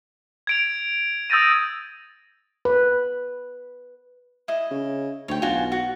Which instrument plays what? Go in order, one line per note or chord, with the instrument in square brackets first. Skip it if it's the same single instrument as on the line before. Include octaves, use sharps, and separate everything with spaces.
[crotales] G#6 D7 F7
D#6 E6 G6 A6 A#6 D#7
[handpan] B4
[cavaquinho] E4 D#5
[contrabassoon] C#3
[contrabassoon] D2 [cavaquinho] C#5 G5
[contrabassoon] B1 [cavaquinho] F4 F#4 G#5
[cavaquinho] F#4